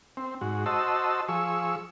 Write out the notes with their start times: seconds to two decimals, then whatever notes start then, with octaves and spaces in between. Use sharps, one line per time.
0.17 C4
0.41 G#2 F#4
0.66 F#4 C5 D#5 A5 E6
1.29 F3 G#4 C#6 E6